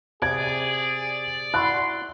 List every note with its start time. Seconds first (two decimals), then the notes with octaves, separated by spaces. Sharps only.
0.22 C3 G#4 D5 G#6
1.54 E4 F#4 C6 F#6